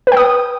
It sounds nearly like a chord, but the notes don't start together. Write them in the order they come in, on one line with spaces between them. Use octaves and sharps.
B4 G5 D#6